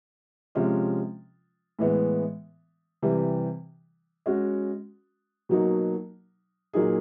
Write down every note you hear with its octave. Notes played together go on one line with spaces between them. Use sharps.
C3 F3 G#3 C#4 F4
A2 E3 G#3 B3
C3 E3 G3
G#3 C#4 F#4
B2 F#3 A#3 D#4
A#2 F#3 A#3 D#4 G#4